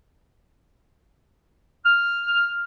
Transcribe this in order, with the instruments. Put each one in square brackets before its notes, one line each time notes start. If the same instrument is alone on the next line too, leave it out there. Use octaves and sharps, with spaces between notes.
[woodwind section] F6